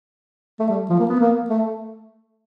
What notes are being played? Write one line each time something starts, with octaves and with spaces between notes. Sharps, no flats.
A3
G3
F3
A#3
B3
A#3
A3